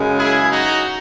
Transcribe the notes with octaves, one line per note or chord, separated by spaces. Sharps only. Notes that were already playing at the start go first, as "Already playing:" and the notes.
Already playing: F#2 C#3 G#3 C#4
E4 G#4
D#4 F#4